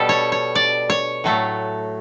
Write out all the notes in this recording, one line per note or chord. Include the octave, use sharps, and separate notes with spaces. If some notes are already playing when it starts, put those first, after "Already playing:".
Already playing: B2 G3 A4
C#5
C#5
D5
C#5
A2 F#3 A3